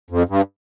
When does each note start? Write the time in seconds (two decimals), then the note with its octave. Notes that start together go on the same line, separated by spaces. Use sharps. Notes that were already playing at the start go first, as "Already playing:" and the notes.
0.11 F2
0.29 G2